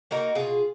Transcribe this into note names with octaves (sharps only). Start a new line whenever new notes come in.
A#3 D#4 F#4 A#4
B2 F4 G#4